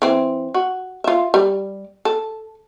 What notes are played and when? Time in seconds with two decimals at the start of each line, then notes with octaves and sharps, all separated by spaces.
0.02 E3 C4
0.54 F#4
1.04 F4 E5
1.34 G3
2.05 A4